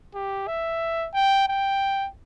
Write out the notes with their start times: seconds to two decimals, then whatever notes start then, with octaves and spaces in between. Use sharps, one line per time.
0.15 G4
0.47 E5
1.14 G5
1.48 G5